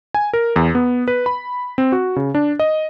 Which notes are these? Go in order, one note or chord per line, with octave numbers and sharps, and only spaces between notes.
G#5
A#4
E2
B3
B4
B5
C4
F#4
C#3
D4
D#5